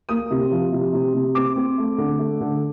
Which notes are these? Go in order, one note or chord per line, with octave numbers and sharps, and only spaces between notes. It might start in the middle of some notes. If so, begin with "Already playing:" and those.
A#3 D#6
C3
F3
C3
C3
C3
C4 D6
C4
A3
D3
A3
D3